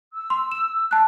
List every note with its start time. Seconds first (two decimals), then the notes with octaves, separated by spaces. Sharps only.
0.13 E6
0.30 C6
0.52 E7
0.91 A5 F#6